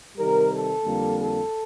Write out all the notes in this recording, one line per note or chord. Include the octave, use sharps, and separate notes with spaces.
C3 D#3 G3 A#4
A4
F2 D3 G3 A#3
A4